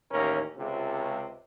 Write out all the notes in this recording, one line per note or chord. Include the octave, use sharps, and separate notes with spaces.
A1 D#2 C#4 A#4
C#2 C3